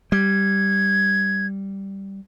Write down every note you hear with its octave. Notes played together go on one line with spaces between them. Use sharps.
G3 G#6